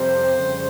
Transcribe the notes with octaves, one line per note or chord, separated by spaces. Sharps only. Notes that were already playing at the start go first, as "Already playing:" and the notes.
Already playing: F2 C3 G3 C5
F2 C#3 G3